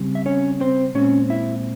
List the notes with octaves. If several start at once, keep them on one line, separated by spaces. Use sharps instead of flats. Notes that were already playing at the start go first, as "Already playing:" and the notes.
Already playing: C#3 G3 C4
E5
C#4 C#5
C4 C5
A#2 G#3 C4 C#4 C#5
E4 E5